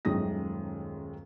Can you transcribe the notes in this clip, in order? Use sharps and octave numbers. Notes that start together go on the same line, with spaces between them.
D#1 F#2 D#3 G#3 D#6 A#6